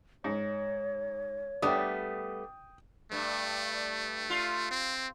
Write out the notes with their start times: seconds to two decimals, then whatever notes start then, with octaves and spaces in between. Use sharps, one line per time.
0.24 G#2 C#5
1.62 G3 A3 B3 D4 G5 D#6
3.12 G2 A3
4.30 F4
4.71 C4